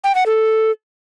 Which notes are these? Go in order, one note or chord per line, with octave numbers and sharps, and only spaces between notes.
G5
F#5
A4